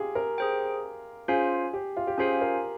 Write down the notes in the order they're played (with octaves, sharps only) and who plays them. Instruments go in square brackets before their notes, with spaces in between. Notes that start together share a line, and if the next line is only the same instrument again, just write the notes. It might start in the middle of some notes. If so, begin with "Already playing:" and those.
Already playing: [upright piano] F4 G4 G#4
A#4
[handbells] G#4 C5 G5
[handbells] C#4 F4 C5 F5 G#5 [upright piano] G#4
[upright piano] G4
F4
G4
[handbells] C#4 F4 C5 F5 G#5 [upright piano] G#4
[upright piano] A#4